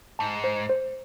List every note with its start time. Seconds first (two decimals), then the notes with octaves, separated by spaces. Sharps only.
0.19 G#2 A5
0.44 C5
0.69 C5